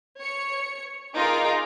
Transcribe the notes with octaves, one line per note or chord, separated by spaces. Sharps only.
C#5 C#7
D#4 F4 G#4 A#4 G#5 D6